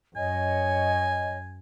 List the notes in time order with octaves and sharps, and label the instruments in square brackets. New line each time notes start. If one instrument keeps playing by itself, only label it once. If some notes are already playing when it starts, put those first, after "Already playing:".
[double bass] F#2 [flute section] C#5 D#5 [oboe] G#5